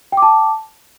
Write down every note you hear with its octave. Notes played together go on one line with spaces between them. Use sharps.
G5 A5 D6